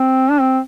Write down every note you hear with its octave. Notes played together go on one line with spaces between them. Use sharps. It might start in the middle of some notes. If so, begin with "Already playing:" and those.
Already playing: C4
D4
C4